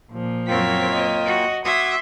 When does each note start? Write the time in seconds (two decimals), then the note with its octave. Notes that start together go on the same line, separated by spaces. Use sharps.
0.11 A#2 F3
0.48 F#2 A#3 C4 F4 C#5 G5 B6
0.89 D#5
1.25 F#4
1.65 F#4 E5 C6 D6 D#6 G#6